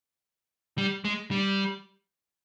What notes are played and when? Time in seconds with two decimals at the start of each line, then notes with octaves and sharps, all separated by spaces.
0.78 G3
1.05 G#3
1.31 G3